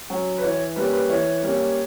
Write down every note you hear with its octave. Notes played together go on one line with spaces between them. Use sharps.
F#3 C#4
B4
E3 C#5
G3 A#3 C#4 B4
B4
E3 C#5
G3 A#3 C#4